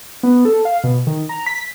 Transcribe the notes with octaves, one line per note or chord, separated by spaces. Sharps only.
B3
A4
F5
B2
D#3
A#5
B6